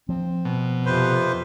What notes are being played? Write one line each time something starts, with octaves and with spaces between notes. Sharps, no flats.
F3 C4
B2
F2 C3 B4 C5